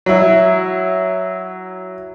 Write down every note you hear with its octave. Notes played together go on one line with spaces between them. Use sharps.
F#3 E4